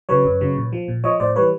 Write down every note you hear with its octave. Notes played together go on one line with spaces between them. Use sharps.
C#3 F#3 B4 C#5
F#2
C#3 F#3
A#2
F3
A#2
F3 C#5 D#5
A2 C5 D5
E3 G3 B4 C#5